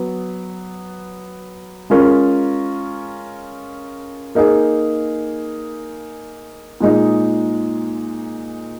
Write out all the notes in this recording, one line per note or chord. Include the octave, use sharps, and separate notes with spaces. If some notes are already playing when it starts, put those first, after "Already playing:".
Already playing: F#3 B3
G#3 C#4 F4 A#4
A#3 D#4 G#4
A#2 G#3 D#4